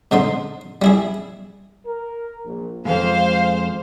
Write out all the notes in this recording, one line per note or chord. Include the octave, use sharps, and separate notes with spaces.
G#2 D3 D#4 C6
G3 E4 G#4
A#4
A#1
F2 G#2 G#3 C5 F5